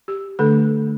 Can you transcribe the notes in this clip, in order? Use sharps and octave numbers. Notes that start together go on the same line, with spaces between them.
G4
D3 A3 D4 A4